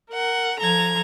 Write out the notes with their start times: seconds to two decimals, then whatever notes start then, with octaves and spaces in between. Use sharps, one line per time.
0.12 A#4 F#5
0.60 F3 A4 A#5 G#6